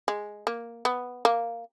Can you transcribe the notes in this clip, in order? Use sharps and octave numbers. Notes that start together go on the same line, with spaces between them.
G#3
A#3
B3
A#3